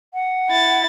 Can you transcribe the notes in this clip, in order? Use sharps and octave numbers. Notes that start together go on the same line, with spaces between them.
F#5
E4 A6